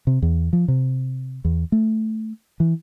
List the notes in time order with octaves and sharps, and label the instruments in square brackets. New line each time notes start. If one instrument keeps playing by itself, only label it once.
[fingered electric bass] C3
E2
F3
C3
E2
A3
E3